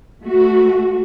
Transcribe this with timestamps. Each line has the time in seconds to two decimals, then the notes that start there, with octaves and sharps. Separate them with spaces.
0.23 A3 F#4